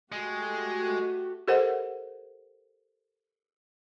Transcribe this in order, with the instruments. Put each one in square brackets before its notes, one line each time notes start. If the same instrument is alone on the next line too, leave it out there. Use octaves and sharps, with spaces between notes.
[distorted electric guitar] G#3 [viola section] A3 F#4 G4
[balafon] G4 A4 A#4 C5 D#5 F#5